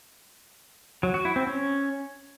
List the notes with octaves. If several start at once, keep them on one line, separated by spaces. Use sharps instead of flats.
F#3
F#4
E4
C4
C#4